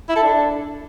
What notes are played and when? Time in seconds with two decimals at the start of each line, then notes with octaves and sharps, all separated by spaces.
0.09 E4
0.16 A4
0.23 D4